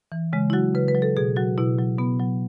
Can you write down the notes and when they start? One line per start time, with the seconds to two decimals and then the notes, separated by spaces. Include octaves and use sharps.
0.12 E3
0.33 C#3 G#3
0.50 E4
0.53 F#3 F#4
0.75 C#3 B4
0.88 B4
0.95 F#3
1.02 A4
1.17 B2 G#4
1.36 F#3 F#4
1.58 B2 E4
1.78 F#3
1.98 B2 B3
2.19 F#3